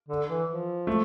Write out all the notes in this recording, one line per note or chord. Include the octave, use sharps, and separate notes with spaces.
D3
E3
F3
A3